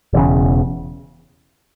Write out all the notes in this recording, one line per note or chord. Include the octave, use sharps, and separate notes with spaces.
E1 E2 C#3